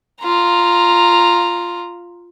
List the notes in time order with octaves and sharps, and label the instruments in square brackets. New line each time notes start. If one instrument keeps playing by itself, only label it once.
[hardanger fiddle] F4 A#5